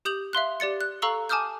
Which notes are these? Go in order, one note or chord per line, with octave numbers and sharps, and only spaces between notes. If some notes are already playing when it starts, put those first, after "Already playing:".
G4 D#6 G6 F7 F#7
E5 F5 C6 F#6
G4 D5 A6 C#7
F#6
A4 F5 A#5 C#6 E6 G7
G#5 A5 D6 D#6 F6 G6